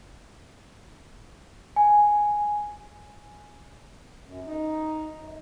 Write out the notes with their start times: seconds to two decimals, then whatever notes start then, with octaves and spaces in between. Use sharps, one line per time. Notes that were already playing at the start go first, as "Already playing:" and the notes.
1.76 G#5
4.24 F#2
4.46 D#4
5.14 F#2